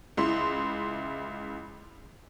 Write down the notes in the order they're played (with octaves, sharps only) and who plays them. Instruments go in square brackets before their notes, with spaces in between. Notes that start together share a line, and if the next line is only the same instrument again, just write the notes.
[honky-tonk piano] C#2 E4 C6